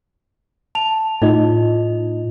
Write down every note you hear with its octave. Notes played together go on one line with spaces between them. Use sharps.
A5 F7
A2 D#4 F4 D#5